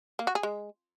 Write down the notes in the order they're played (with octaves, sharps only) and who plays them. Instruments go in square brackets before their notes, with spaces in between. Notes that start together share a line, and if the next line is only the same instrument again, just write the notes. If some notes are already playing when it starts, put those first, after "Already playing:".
[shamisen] A#3
F#4
G#4
G#3